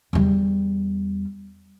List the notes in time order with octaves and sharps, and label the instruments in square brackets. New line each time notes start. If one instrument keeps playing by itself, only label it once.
[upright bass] E2 G3